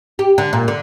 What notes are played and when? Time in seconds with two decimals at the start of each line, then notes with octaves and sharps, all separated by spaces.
0.19 G4
0.38 D3
0.53 A#2
0.68 D3